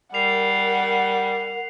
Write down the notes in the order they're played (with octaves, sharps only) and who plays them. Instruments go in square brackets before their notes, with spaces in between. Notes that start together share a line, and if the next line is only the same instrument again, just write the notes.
[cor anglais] G3 [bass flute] A#4 [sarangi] F#5 [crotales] C7 F7